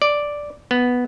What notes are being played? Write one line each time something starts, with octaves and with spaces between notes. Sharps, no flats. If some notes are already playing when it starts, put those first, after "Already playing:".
D5
B3